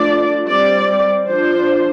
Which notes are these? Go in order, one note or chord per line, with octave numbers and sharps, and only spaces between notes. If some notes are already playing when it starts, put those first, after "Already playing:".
Already playing: F3 A3 D4 D5
G3 C4 D5
F3 D4 C5